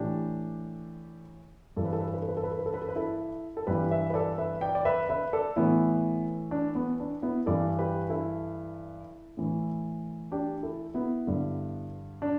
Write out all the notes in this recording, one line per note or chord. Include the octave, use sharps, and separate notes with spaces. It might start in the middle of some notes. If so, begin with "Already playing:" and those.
Already playing: A2 E3 D4 G4
G2 E3 A4
B4
A4
B4
A4
B4
A4
B4
A4
B4
A4
B4
A4
B4
A4
B4
E4 A4
A4
G2 E3 G4 B4
B4 E5
B4
A4 D5
B4 E5
D5 G5
D5
B4 E5
B4 E5
A4 D5
A2 E3 B3 E4
D4
B3
D4
B3 E4
G2 E3 A4 D5
G4 B4
E4 A4
A2 E3
D4 G4
E4 A4
B3 E4
G2 D3
D4